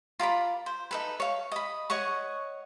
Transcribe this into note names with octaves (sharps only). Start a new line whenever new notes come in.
F4 A#4 D5 B5
C5
D#4 A4 B4
C#5 F5
D#5 B5
C#5 D#5 F#5 C#6